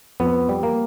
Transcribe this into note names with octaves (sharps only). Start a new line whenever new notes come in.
F2 B3
G3
A#3